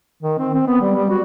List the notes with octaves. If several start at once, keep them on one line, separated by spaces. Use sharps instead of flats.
D#3
C4
C4
B3
G3
G3
F#4